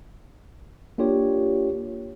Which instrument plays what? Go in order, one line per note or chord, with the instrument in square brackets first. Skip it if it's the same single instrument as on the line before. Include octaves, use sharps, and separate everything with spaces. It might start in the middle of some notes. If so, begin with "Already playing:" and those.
[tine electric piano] A#3 D4 F4 G4 C#5